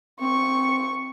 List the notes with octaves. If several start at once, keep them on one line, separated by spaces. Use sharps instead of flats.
C4 C#6